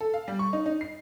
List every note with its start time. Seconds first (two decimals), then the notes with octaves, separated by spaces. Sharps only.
0.01 A4
0.14 F5
0.28 G3
0.39 C#6
0.53 D#4
0.66 D#4
0.81 C7